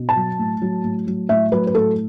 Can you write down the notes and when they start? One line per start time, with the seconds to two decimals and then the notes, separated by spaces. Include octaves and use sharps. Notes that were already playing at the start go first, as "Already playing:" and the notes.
Already playing: B2
0.09 A5
0.16 F#3
0.39 A2
0.62 F#3
0.84 A2
1.07 F#3
1.29 A2 E5
1.52 F#3 B4
1.67 B4
1.75 A2 A4